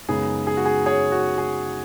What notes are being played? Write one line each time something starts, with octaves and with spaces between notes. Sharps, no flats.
F#2 C#3 G#3 B3 D#4 G#4
G#4
F#4
G#4
G#4 C#5
F#4
G#4